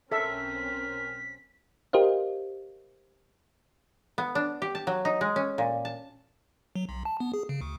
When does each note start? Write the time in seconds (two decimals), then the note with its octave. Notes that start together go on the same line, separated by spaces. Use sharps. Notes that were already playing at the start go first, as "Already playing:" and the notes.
0.12 B1 C4 C#4 A4 A#4 E5 B6
1.93 G4 A#4 C5 D#5 F5
4.18 B3
4.35 D4
4.62 G4
4.75 A5
4.87 F#3
5.05 D#4
5.21 G#3
5.36 C#4
5.58 A#2
5.85 A5
6.76 F#3
6.89 B1
7.05 A5
7.20 B3
7.34 G#4
7.49 C#3
7.61 D2